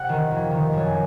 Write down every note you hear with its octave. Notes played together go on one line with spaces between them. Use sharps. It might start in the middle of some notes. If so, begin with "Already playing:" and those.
Already playing: C3 F#5
D#3
F2
D#3
F#2